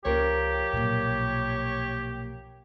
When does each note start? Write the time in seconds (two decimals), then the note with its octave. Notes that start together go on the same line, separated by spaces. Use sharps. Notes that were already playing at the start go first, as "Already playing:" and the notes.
0.05 C#2 F3 A#3 C#4 G4 A#4 C#5
0.73 B1 A#2